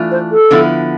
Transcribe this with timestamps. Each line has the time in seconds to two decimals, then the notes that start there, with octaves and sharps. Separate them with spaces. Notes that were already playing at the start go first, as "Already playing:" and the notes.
Already playing: E3 A3 D4 F4
0.11 C5
0.31 A4
0.51 D3 F3 B3 E4